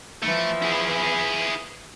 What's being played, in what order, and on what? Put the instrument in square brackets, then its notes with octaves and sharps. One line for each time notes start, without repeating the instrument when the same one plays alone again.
[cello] E3 F3 [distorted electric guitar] A3
[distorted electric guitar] E4 G#4